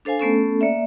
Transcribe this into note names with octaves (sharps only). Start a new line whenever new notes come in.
D4 A4 C5 F5 G#5
A3 B3 C#4 A4
A#3 D5 E5